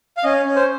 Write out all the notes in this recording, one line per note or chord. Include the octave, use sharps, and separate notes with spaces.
F5
C#4 D#5
C#4
C5